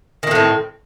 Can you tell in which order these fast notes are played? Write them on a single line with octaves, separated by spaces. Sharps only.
D#3 A#3 A2 C4